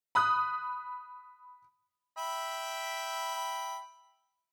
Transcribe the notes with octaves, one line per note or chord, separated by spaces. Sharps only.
B5 D#6 F#6
E5 G5 B5